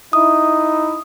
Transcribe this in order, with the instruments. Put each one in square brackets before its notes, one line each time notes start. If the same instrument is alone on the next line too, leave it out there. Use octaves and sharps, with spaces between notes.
[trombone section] D#4 E4 [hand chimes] D#6